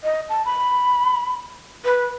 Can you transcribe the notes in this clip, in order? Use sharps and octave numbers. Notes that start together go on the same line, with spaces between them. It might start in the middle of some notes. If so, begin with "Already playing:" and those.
D#5
A5
B5
B4